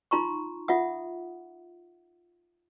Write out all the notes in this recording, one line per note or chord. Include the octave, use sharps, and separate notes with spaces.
D#4 F4 A#5 C6 C#6
F4 E5 F#5 D#6